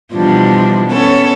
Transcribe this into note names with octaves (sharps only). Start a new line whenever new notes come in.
B2 E3 F3 G3 D4
B3 C#4 A4 C#5